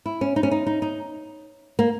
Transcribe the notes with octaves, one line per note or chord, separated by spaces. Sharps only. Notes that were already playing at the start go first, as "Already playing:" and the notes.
E4
C#4
D#4
C#4
D#4
D#4
D#4
A#3